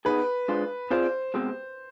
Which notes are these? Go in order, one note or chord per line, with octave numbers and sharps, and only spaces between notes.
B3 D#4 G#4 B4
G#3 D4 F4 G#4 C5
C4 F4 G#4 C5 D5 F5
B2 G#3 C4 G4